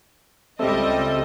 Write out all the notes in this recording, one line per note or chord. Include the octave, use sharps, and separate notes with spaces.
C#2 G3 C4 A4 D#5 E5